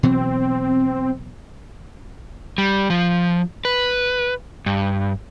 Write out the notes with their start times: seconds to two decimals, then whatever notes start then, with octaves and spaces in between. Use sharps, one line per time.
0.03 B2 E3 F#3 C4
2.58 G3
2.90 F3
3.65 B4
4.66 G2